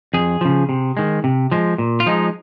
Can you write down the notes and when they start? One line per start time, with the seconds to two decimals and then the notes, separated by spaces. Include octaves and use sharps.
0.14 F2 G#4
0.41 C#3 F3
0.69 C3
0.97 D#3 G#3
1.24 C3
1.52 F3 G#3
1.78 A#2
2.00 F4
2.06 F3 G#3 D#4